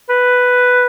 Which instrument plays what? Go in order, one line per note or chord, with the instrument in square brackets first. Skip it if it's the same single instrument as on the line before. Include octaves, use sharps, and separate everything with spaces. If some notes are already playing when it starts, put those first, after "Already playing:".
[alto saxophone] B4